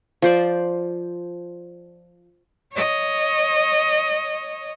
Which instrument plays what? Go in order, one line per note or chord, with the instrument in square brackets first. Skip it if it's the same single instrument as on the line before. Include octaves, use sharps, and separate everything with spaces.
[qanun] F3 C5 D5
[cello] C#5 D#5